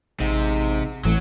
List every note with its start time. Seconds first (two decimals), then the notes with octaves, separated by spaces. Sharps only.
0.20 A1 G#2 C3
1.05 A1 A2 F#3